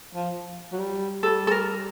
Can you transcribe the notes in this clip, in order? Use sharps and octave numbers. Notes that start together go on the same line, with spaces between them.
F3
F#3
G3
G3 A4
A4
A#4